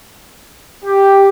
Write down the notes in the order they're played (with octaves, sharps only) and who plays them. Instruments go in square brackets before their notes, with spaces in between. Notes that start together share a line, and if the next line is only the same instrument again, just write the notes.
[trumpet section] G4